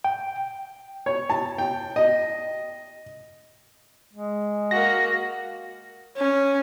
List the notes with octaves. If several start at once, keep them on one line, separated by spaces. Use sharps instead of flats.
G5
C#5
A5
G5
D#5
G#3
A#3 F#4 A#6
C#4